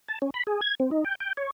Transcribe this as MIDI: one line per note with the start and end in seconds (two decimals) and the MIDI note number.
0.08 0.19 81
0.22 0.30 61
0.34 0.43 83
0.47 0.61 68
0.61 0.75 92
0.80 0.90 60
0.91 1.04 63
1.05 1.15 79
1.20 1.33 79
1.37 1.50 73